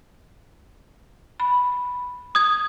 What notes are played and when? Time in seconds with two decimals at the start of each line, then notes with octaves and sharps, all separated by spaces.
1.40 B5
2.35 D#6 G#6